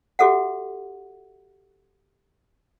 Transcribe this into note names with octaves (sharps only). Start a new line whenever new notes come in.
F#4 G4 A4 E5 F#5